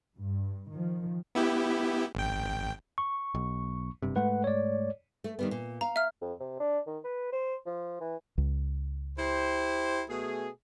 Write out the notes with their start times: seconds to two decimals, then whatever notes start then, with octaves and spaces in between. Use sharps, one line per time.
0.17 G2
0.71 D#3 F3
1.35 B3 E4 G4
2.15 G#1 G5
2.98 C#6
3.35 B1
4.02 F#1 G2 C3
4.16 G#2 G#3 A3 B4 F#5
4.44 C#5 D5
5.24 A3
5.39 D#3 G3 B3
5.51 A#2
5.81 F5 A#5
5.96 E5 F6
6.21 F2
6.40 C3
6.60 D4
6.87 D#3
7.04 B4
7.33 C5
7.66 F3
8.01 E3
8.38 C#2
9.18 E4 G4 C5
10.08 B2 A3 G#4